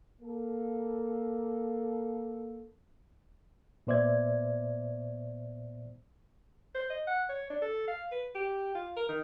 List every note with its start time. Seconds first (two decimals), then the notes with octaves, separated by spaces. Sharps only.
0.22 A#3 A4
3.87 A#2 B3 C5 D5 E5 G#6
6.75 C5
6.90 D#5
7.07 F#5
7.29 C#5
7.50 D4
7.62 A4
7.88 F5
8.11 B4
8.35 G4
8.74 F4
8.96 A#4
9.08 D#3